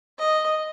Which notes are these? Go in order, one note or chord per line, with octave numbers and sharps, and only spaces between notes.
D#5